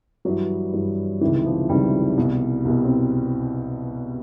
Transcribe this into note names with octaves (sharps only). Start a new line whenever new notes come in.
G2 E3 F#3
G2 E3
C#2 C3 D#3 E3
F3
C#2 C3 D#3 G3
C2 B2
C2 B2
C4